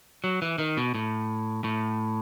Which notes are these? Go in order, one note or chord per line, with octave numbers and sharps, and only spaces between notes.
F#3
E3
D#3
B2
A2
A2